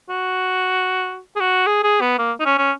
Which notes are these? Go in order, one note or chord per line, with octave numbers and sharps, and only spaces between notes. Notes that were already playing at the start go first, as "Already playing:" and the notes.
F#4
G#4
F#4
G#4
G#4
B3
A#3
D#4
C#4
C#4